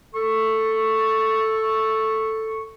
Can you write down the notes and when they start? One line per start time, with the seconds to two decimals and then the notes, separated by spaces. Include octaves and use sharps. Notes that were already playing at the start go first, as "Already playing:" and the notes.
0.15 A4 C#6